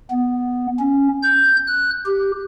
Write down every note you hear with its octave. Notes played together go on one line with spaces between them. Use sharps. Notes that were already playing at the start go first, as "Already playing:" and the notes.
B3
C#4
G6
F#6
G4